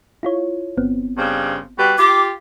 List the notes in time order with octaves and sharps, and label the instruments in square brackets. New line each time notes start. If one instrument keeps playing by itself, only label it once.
[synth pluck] E4 F4 C#5
G1 B3 C4
[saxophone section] G2 C#3 C5
G3 F#4 B4
[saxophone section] F4 G4 [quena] D6